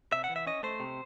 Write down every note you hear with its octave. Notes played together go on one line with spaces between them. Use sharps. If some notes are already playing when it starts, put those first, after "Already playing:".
C3 E5
F#5
E3
E5
C#4 D#5
A3 C5
C3